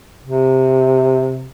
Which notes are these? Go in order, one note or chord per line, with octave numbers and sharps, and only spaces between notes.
C3